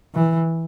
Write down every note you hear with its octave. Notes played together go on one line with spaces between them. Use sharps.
E3